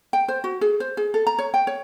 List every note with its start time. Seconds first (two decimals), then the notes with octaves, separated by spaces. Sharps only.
0.13 G5
0.28 C5
0.44 F#4
0.61 G#4
0.80 C5
0.97 G#4
1.14 A4
1.27 A#5
1.39 C#5
1.54 G5
1.67 C#5